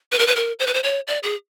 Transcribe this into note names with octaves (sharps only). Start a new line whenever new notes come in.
B4
A#4
B4
A#4
C5
B4
C5
C#5
D5
G#4